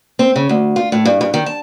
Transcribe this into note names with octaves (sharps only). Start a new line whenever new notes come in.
C4
C#3
D2
F4
A2
G2
G2
D#3
A5